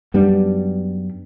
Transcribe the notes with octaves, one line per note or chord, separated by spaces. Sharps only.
F#2 G3 B3 D4